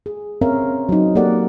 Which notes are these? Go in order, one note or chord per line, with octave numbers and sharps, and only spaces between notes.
G#4
C4 C#4 A#4 C#5 E5 F5
F#3 D#4
A#3 G4 A4 A#4 D5 F#5